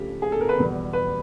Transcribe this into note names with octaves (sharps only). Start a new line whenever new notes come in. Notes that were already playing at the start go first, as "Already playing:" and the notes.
Already playing: C#3 F3 A3 G4
G#4
A4
A#4
B4
E2 B2 G3
B4